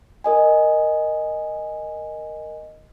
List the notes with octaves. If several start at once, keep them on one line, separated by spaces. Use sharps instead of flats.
A#4 D#5 G#5